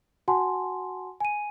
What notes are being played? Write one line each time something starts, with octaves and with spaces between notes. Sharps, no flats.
F#4 F#5 G#5 A5 C6
G#5 D#7